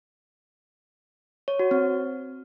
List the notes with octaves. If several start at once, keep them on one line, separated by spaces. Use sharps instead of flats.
C#5
F#4
C4